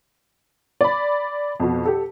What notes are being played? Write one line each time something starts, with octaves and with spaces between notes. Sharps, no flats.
D5 B5
F2 B2
G4 A4